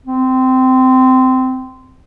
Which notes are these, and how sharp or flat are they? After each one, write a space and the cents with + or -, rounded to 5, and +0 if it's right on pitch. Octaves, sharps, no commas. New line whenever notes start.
C4 -15